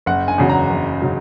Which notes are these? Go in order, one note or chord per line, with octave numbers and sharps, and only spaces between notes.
F#1 F#5
G#5
E2 C#3 F#3
A#5
F#1
C#3 F#3